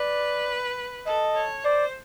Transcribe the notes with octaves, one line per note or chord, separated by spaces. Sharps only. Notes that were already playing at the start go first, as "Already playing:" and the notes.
Already playing: B4 D5
A4 D#5
C#5
C5 D5